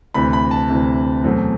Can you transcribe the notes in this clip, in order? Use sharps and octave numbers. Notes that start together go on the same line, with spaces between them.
D2 C3 E3 B5
B5
A5
D2 C3 E3
E2 B2 F#3 A3 C4